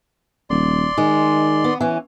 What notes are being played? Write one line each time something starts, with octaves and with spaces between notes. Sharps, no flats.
D#1 D5 C6
D#3 G#3
B3
E3 C#4